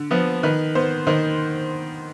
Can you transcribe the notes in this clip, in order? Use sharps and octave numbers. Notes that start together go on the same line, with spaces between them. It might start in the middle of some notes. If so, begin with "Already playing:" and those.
Already playing: D3
F3 B3
D#3 B4
B3 C5
D#3 C5